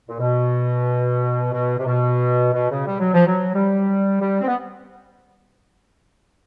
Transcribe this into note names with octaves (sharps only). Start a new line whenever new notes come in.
A#2
B2
B2
C3
B2
B2
C#3
G3
F#3
F3
F#3
G3
G3
C4
B3